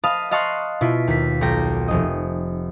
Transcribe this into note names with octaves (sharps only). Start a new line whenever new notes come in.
D#5 F5 A5 B5 D#6
D#5 F5 A5 C6 C#6 F#6
B2 E4 F4 B6
D#2 B6
B1 G5 A#6
F1 D#5